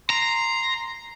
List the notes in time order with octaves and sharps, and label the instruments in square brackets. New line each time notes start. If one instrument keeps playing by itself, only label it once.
[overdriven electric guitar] A#5 [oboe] C6